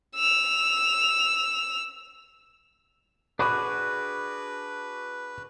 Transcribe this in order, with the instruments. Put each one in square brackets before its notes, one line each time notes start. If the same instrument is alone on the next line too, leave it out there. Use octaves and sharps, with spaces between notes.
[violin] E6 F7
[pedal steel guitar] D4 F#4 G#4 [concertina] B4 [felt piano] B5 D6